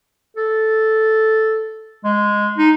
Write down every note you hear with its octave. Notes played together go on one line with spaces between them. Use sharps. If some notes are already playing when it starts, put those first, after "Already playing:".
A4
G#3
D#4